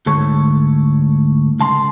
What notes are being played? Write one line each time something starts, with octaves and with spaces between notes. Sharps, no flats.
D2 G#2 A4 C#5
C#2 A5 C6